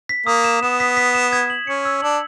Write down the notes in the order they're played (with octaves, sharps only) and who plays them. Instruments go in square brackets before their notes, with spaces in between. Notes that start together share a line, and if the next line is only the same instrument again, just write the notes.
[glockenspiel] B6
[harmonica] A#3 [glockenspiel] D#6
[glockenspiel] E7
[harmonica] B3 [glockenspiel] E7
[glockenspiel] B6
B6
E7
G#6
F#7
[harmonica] C#4 [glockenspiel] C#7
[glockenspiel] E6
[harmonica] D4 [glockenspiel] F#7